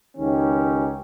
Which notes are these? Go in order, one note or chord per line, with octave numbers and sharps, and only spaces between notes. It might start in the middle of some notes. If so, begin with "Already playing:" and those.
C#2 D#3 C#4 D#4 G4